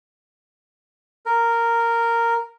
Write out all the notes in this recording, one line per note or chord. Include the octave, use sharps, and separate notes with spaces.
A#4